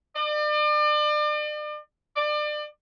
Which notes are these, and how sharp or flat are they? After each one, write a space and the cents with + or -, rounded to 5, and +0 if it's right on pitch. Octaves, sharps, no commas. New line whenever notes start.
D5 +40
D5 +30